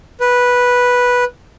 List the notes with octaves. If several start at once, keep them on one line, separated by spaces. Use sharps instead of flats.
B4